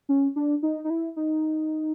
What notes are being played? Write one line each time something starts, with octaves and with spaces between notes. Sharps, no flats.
C#4
D4
D#4
D#4
E4
D#4